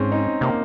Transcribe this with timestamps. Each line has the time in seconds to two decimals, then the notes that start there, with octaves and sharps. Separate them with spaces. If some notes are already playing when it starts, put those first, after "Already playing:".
Already playing: G#2 C4 C#4
0.12 D#4
0.41 C3 A#3